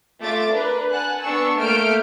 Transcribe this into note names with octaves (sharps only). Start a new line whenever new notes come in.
A3 F4 E5 D6 A6
D4 A#4 B4
F#5 G#5 A5 F#6
B3 D4 C#6 E6
A3 A#3 F6 G6 D7